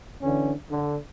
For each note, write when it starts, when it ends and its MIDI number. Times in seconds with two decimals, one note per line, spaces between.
0.22 0.52 50
0.22 0.52 52
0.22 0.52 61
0.70 0.96 50